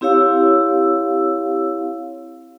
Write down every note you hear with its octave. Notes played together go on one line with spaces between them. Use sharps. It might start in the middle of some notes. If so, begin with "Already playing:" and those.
C4 E4 G4 C#5 F5 E6